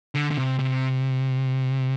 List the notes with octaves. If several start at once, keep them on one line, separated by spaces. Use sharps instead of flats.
D3
D3
C3
C3